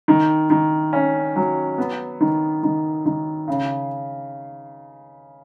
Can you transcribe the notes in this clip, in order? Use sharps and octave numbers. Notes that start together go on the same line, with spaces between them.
D#3
D#3
C#4
F#3
B3
D#3
D#3
D#3
C#3